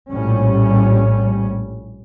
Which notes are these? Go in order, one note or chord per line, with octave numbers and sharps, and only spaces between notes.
A#1 A2 G3 C#4